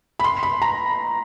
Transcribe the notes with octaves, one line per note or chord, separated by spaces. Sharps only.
B5
C6
B5
A#5